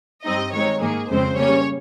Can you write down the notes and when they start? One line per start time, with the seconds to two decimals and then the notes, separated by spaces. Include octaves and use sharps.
0.25 G2 G3 C4 D#4 D#5
0.53 D#3 G#3 C4 D#4 C#5
0.81 G#2 D#3 A#3 G#4
1.10 F2 C#3 G#3 C4 C5
1.38 C#3 G3 A#3 C#4 C#5